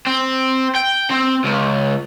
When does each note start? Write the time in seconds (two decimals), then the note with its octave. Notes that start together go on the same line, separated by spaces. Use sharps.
0.07 C4
0.76 G5
1.11 C4
1.45 C#2